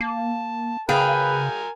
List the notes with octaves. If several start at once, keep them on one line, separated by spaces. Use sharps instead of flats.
A#3 A5
C#3 G#4 A#4 B4 F5 G5 G#5